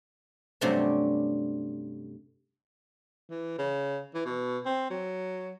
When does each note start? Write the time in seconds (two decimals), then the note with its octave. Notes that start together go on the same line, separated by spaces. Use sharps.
0.61 G2 C3 F#3 A3 C#4 D4
3.30 E3
3.58 C#3
4.14 E3
4.26 B2
4.66 C4
4.90 F#3